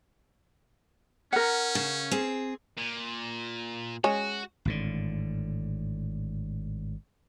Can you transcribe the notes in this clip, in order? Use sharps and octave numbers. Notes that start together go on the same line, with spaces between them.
C#4 A#4 F#5
C#3
C4 G#4
A#2
G#3 C#4 F#4
G#1 A2 D3